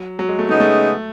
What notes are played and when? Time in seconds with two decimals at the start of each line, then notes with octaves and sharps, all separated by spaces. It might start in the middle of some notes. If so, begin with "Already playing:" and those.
Already playing: F#3
0.19 F#3
0.29 G#3
0.39 A3
0.49 C#3 G#3 A3 B3 D#4
0.60 A3